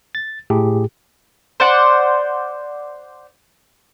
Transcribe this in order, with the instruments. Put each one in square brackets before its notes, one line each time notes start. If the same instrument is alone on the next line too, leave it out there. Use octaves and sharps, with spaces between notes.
[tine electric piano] A6
A2 G4 G#4
[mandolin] C5 D5 F#5